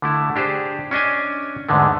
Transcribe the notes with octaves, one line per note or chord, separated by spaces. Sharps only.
D3 A3 E4
D4 G4 G#4 C5
C#4 D4 D#5 G#5
E2 G#2 D3 G#3 A3